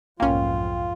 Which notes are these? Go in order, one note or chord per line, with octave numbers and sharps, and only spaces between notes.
B1 F2 G#2 A#3 C#4 F4 F5 G5